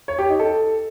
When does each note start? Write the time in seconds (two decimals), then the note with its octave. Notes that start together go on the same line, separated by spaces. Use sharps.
0.08 C#5
0.19 G4
0.29 D#4
0.39 A4